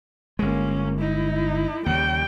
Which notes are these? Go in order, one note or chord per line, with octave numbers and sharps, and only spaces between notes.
G1 G#3 A#3 C#4
D#4 E4
D#2 C#3 G3 G5